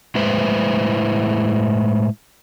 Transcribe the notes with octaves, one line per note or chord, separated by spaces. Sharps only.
A2 G#3 E4 B4 C5